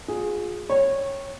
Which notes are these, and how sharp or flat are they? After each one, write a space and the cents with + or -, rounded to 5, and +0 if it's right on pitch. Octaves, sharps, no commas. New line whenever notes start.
F4 +40 G#4 +0
C#5 -15 G5 +0